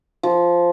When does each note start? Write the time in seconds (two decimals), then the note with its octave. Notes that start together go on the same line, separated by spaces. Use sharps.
0.23 F3